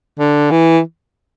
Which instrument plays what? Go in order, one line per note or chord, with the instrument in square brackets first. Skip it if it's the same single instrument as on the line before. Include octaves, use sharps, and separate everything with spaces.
[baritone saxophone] D3
E3